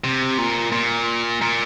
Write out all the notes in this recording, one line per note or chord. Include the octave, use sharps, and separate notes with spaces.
C3
A#2
A#2
A#2